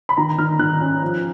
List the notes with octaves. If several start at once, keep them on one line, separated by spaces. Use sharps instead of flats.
B5
D#3 A#5
D#3 F6
D#3 F#6
C#4
F3